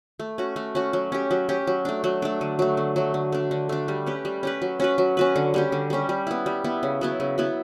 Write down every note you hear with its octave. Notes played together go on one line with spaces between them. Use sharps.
A3
C#4 F#4
A3
C#4 F#4
F#3
C#4 G4
F#3
C#4 G4
F#3
A3 D4
F#3
A3 D4
D3
F#3 A3
D3
F#3 A3
D3
A3 D4
D3
A3 D4
G3
C#4 G4 B4
G3
C#4 G4 B4
F#3
C#4 F#4 B4
F#3
C#4 F#4 B4
D3
G3 C#4 G4
D3
G3 C#4 G4
G3
B3 E4
G3
B3 E4
C#3
F#3 B3 E4
C#3
F#3 B3 E4